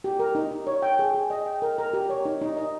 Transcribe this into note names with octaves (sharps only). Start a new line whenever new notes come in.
G4
A#4
D#4
D#4
C#5
G5
G#4
G#4
D#5
G5
A#4
A#4
G4
C#5
D#4
D#4
D#5